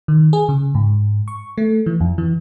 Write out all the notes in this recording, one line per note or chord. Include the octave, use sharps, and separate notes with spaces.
D#3
G#4
C#3
G#2
C#6
A3
E3
F2
E3